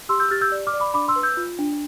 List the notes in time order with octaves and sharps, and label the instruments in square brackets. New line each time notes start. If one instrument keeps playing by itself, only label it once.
[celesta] G4 C6 E6
E6 G6
G4 F6 A6
E6 G6
D5
D6 F6
D5
B5 D6
D4 B5 D6
C6 E6
B4
E6 G6
F4
D4